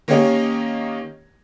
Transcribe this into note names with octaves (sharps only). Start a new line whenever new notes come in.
D#3 A#3 C#4 G4 C#5 D#5